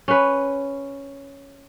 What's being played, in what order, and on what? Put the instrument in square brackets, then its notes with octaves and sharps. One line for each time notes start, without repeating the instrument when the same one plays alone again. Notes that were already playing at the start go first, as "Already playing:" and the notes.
[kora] C#4 B4